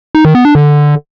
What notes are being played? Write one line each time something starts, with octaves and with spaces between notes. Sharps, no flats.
D#4
D#3
B3
D4
D3